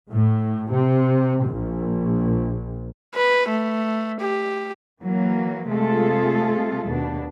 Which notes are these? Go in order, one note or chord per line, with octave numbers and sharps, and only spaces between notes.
A2
C3
A#1
B4
A3
G4
E3 F#3 A#3
C3 G#3 A3 F4 G#4 A4
D#2 B2 D4